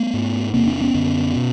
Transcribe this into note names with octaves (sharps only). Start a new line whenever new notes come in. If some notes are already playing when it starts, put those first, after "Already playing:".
Already playing: A3 B3
G#2
E2 C3 A#3 C4
C4 D4
B3 C#4
F#2 D3
B2